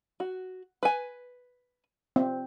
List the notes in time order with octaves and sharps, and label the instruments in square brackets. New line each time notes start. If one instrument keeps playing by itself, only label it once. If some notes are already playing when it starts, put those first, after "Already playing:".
[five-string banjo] F#4
B4 G#5
[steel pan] C4